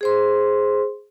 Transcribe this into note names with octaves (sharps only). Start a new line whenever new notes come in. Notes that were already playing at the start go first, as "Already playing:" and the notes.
G#4 C5 C6